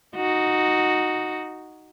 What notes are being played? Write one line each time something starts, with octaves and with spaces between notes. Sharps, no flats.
D#4 F#4